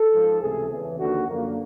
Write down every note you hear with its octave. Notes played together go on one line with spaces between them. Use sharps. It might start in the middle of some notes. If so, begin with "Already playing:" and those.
Already playing: A4
G#2 F3 G#3
C#2 C3 E3 A3 G#4
E2 C#3 E3
D#2 D3 F3 A#3 F#4
F#2 D3 F3 A#3